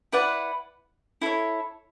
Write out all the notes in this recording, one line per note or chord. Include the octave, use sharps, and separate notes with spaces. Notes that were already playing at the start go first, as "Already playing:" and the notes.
E4 B4 D5 F#5
E4 A4 C#5